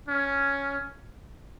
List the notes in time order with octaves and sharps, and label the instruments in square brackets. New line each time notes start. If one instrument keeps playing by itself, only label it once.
[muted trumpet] C#4